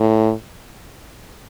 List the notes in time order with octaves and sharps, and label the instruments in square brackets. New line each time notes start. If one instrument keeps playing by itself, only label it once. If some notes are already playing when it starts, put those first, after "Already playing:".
Already playing: [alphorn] A2